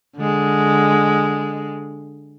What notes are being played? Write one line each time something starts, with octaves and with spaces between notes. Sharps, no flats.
D3 G#3